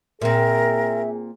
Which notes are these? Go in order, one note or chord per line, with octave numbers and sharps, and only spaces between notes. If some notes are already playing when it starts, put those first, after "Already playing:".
A#2 C4 G#4 A#4 E5